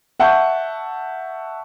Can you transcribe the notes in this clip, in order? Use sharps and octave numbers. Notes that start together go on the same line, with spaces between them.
E5 F#5 A5 C#6 G6